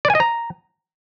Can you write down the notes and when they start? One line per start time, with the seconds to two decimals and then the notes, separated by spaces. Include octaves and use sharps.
0.05 D5
0.10 G#5
0.15 D#5
0.20 A#5